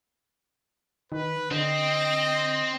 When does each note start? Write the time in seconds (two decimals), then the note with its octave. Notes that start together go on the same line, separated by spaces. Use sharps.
1.12 D#3 B4
1.51 D3 C4 D#5